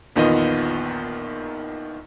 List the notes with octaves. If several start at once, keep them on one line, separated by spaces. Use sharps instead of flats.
A#1 E2 D#3 B3 F4 D#5